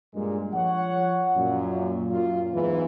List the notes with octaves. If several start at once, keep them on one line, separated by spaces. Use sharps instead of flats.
G2 A#2 G#3
F3 C#5 F#5
F#2 A#2
F#2 A#2 F4
E2 G#2 E3